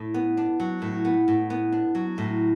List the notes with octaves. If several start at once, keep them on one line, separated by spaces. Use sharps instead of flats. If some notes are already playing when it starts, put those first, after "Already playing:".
Already playing: A2
B3
D4
F#3
A2
B3
A2
B3
D4
F#3
A2